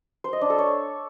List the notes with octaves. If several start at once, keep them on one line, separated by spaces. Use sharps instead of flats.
C5
D#5
D4
A4
C#5